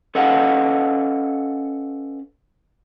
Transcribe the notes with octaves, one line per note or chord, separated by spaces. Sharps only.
C#4 A4 B4 D#5 F5 F#5